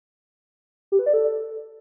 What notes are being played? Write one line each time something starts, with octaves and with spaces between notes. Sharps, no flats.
G4
B4
D5
A4